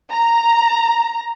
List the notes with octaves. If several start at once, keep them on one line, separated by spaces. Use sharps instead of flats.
A#5